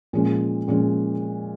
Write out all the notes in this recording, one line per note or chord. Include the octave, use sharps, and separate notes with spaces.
A#2 F3 G#3 C#4
A#2 F3 G#3 C#4